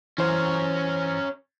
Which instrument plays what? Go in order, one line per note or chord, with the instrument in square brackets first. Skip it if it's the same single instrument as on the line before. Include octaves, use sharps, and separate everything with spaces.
[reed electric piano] E3 C5 [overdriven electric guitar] C#4 A#4